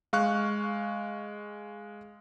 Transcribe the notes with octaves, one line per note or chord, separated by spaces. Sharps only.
G#3 F5 C#6 F#6